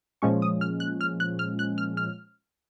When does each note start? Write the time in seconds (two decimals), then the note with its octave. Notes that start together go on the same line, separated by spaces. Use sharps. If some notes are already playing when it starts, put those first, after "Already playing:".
0.22 A#2 F3 G#3 C#4 C#6
0.42 D#6
0.61 F6
0.80 F#6
1.01 F6
1.20 F#6
1.39 F6
1.59 F#6
1.78 F6
1.97 F6